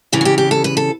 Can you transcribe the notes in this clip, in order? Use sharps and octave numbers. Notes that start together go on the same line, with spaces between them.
E2 C#3 E3 G4
F#4
G4
G4
A4
B4
A4